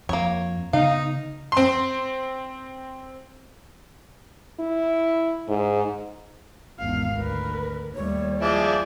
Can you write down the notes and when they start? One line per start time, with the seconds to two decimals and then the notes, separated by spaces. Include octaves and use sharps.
0.09 F2 A#3 C#5
0.73 C#3 B3 D#4 F5
1.52 C4 C6
4.60 E4
5.48 G#2
6.79 G#1 E2 F5
7.17 D2 A#4 B4
7.95 D#2 G3 A3 C#5
8.42 F3 G#3 E4 D5 D6